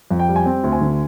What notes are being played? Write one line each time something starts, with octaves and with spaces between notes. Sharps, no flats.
F2
G5
G3
G#5
C4 G5
D2
G#5
D3